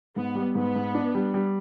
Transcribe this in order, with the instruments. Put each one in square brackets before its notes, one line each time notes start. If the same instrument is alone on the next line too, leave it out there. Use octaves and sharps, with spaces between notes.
[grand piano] G#2 [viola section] B3
[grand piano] G3
[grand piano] G#2 [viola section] B3
[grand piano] G#2
D4
G3
G3